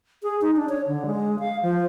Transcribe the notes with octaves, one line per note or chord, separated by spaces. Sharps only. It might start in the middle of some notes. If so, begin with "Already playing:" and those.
G#4
D#4
D4
C#5
D3
G#3
F5
F3